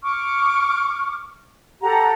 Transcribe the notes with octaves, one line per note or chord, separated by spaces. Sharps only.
C#6 D6 F6
G4 A4 F#5 A#5